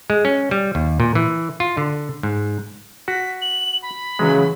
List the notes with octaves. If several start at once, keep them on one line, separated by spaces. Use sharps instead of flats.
G#3
C#4
G3
D#2
A#2
E3
F4
D3
G#2
F#4 B6
F#7
B5
C#3 E3 F#3 G#3